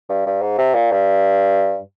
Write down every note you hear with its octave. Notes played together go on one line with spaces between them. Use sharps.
G2
G2
G#2
C3
A#2
G2